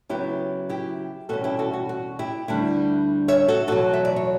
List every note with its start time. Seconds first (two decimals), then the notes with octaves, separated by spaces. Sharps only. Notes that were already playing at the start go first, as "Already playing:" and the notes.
0.09 C#3 F#3 B3 E4 G4
0.69 E4 G4
1.29 E2 B2 G3 C#4 F#4 A4
1.44 E4 G4
1.59 F#4 A4
1.73 F#4
1.89 F#4
2.19 E4 G4
2.48 D2 D3 G3 D4 E4
3.28 C#5 E5
3.48 F#4 A4
3.67 E2 B2 F#3 F#4 A4
3.93 E5
4.05 D5
4.16 C#5